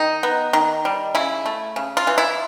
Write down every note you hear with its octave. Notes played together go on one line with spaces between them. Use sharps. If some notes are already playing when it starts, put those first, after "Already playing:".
Already playing: D#3 D#4
B3
D#3
G3
C#3 E4
A3
C#3
F4
E3
E4